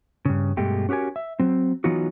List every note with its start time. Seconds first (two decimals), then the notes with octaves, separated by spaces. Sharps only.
0.25 G2 C#3
0.57 G2 B2 G#3 A3 G4
0.89 C#4 F#4 G4 A#4 G#5
1.16 E5
1.39 F#3 C4
1.84 E3 F#3 B3 D#4 F4 F#4